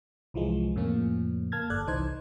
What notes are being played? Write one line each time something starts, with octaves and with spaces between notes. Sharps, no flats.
C2 E3 F3 G#3
F2 A2 C#3 F3 A#3 C#4
A#3 A5 F6 G#6 A6
G1 A4 D5 F#6 G#6
C2 E3 D#4 C5 G#6